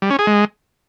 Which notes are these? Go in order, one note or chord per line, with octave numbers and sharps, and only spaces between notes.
G3
C#4
G#4
G#3